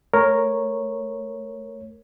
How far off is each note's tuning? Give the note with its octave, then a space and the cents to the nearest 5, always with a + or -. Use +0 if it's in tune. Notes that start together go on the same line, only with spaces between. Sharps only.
A3 +0 A#4 +0 C#5 -10